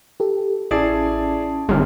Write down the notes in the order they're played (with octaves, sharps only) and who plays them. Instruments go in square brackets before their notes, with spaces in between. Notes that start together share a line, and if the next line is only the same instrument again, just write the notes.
[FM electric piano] G4 A4
[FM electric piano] A1 [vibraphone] C#4 A5 [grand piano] E4 G#4 D5
[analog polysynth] G#1 [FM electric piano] C6 F6